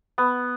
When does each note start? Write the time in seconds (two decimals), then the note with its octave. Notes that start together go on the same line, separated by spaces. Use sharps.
0.18 B3